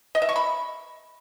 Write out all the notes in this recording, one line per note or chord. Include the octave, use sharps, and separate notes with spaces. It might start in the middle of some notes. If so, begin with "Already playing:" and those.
D#5
E5
C#6
B5